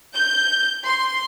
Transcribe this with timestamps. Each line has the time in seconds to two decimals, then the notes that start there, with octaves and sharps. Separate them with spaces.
0.14 G6
0.84 C6